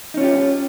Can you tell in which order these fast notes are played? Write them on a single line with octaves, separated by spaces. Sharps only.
D#4 C#4 F4 G4